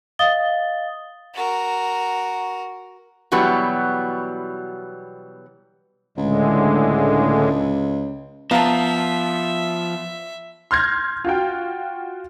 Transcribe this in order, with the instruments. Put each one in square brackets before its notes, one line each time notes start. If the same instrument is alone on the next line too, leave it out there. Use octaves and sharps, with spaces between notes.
[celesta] D#5 F5 D#6 A6 G7
[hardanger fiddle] F#4 A#4
[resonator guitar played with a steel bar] B2 E3 F#3 G3 B3
[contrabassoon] C#2 [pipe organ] A2 D3 G#3
[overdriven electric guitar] F3 [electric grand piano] B3 F5 [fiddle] E5 [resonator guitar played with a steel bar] A5 A#5
[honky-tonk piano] C6 F6 G6 G#6 A#6
F4 F#4 G5